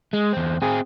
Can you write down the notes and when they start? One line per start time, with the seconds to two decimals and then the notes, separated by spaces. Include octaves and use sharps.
0.13 G#3
0.33 E2 C4
0.62 C4 G#4